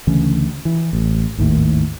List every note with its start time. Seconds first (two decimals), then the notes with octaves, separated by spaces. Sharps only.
0.07 D2 C#3 E3 C#4
0.65 E3
0.93 A1
1.38 G#1 D#2 A2